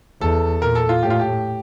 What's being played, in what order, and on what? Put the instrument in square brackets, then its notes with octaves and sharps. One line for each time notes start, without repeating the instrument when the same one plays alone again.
[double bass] E2 [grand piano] A4
[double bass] A#2 [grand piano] A#4
[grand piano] A4
F4
[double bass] A2 [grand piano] G4
[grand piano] F4
G4